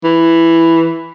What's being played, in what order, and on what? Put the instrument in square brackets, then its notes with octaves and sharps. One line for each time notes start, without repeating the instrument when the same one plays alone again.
[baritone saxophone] E3